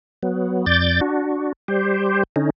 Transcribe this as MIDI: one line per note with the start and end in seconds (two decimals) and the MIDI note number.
0.23 0.66 54
0.23 0.66 59
0.66 1.01 41
0.66 1.01 74
0.66 1.01 91
0.66 1.01 93
1.01 1.52 62
1.01 1.52 66
1.68 2.23 55
1.68 2.23 67
1.68 2.23 72
2.36 2.50 50
2.36 2.50 61
2.36 2.50 63